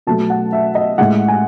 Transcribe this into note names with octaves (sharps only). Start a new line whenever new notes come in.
B2 F#3 A3 A5
F#5
E5
D#5
A2 G#3 F#5
G#5